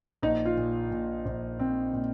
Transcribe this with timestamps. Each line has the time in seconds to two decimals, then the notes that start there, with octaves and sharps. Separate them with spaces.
0.22 A#1 D#4
0.46 F4
0.57 A#2
0.91 A#2
1.25 A#1
1.59 A#2 C4
1.93 A#2